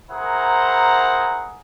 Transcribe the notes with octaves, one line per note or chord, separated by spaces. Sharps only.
E4 G#4 A#4 C5 F#5 A#5